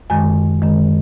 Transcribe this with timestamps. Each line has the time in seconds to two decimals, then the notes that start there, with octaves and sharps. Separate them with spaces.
0.10 F#2 D#3 G#3 G#5
0.62 F#2 D#3 G#3